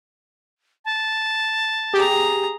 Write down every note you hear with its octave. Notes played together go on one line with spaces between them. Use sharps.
A5
G4 G#4 A#5